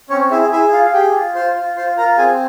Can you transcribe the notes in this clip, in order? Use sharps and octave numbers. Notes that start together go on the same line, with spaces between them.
C4 C#4 C#5
E4 G#4 E5
E4 G#4 E5
F4 F5
F5
G4 G#4 G5
F4
F4 C5 C6
F4
F4 C5 C6
F4 A#4 A#5
C4 G#4 G#5